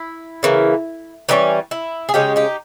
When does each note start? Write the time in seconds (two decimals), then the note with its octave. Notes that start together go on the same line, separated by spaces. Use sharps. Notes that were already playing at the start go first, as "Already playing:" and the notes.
Already playing: E4
0.43 C#3 E3 A#3
1.29 E3 G3 C#4 D#4
1.71 E4
2.09 G#4
2.14 C#3 G#3 C#4 D#4 G4
2.36 D#4 G4